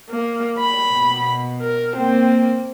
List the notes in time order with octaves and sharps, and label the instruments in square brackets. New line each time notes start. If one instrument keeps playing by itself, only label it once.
[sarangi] A#3
B5
[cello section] B2
[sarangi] A#4
[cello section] A#3 [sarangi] C4